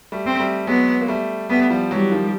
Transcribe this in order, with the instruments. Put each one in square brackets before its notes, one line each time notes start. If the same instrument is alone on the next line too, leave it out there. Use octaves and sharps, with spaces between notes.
[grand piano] G3 A3
[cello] C4
[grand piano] G3 A3
[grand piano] F#3 G#3 [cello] B3
[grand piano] A#3
G3 A3
[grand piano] G3 A3 [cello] B3
[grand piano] F3 G3
[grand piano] E3 F#3 [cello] G3
[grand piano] D#3 F3